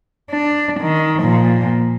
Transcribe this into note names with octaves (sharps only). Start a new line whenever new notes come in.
D4
D#3
A#2 F3